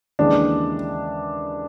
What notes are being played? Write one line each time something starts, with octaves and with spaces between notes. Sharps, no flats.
D#2 C#3 E3 G#3 D4